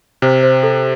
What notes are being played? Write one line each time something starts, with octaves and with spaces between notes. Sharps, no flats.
C3 C5
C5
A4